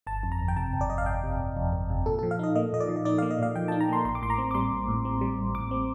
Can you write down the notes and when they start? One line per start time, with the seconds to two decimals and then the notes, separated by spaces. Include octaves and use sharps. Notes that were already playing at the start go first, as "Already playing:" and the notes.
0.07 G1 A5
0.23 F2
0.32 A#5
0.40 G1
0.48 G5
0.56 C3 A5
0.73 G1
0.81 D5
0.89 F2 D#5
0.98 F5
1.06 G1 G5
1.23 C3
1.39 G1
1.57 F2
1.73 G1
1.90 C3
2.06 A#2 A4
2.19 F3 A4
2.31 F5
2.39 D#4 D#5
2.55 A#3 D#5
2.73 A#2 D#5
2.80 D5
2.89 F3
2.96 D#5
3.05 D#4 D5
3.18 A#3 F5
3.31 D#5
3.39 A#2 F5
3.56 F3 G5
3.68 D#4 A5
3.81 A#5
3.89 A#3 C6
4.05 A1 C6
4.15 D6
4.22 A2 C6
4.30 A#5
4.38 C4
4.51 D6
4.55 G3 C6
4.71 A1
4.88 A2
5.05 C4
5.21 G3
5.38 A1
5.55 A2 D6
5.71 C4